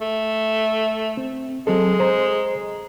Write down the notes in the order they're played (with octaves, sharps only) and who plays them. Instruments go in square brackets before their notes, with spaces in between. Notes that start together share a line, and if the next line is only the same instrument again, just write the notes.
[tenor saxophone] A3
[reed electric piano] C4
[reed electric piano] F#3 C4 A4 [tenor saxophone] G#3
[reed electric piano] C5 A#5